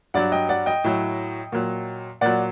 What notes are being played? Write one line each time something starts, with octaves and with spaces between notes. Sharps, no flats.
G2 F#3 D5 F#5
D#5 G5
D5 F#5
D#5 G5
A2 F#3
A#2 F#3
A#2 F#3 D5 F#5